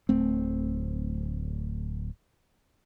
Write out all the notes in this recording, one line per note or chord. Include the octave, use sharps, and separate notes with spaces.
D1 A3 C4